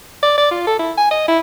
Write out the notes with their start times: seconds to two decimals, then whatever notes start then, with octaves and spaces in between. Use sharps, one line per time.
0.22 D5
0.38 D5
0.51 F4
0.67 A4
0.79 E4
0.98 G#5
1.11 D#5
1.28 E4